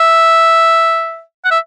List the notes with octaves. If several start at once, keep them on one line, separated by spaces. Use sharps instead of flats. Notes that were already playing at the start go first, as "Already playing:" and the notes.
Already playing: E5
F#5
E5